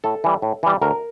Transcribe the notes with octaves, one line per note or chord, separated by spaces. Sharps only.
A2 A4
E3 G3
A2
E3 G3
D2 A#4